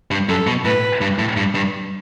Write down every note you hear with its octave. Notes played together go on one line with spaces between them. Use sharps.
G2
F#2 A4
B2
A2 B4
G2
A2
G2
G2